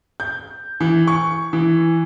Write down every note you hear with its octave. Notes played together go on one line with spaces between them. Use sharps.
G6
E3
C#6
E3